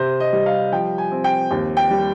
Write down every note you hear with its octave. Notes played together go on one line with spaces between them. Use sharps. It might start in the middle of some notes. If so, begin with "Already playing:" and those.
Already playing: C3 C5
D#5
G3
F5
F3 G5
G#5
C4
G5
D#2
G5
G3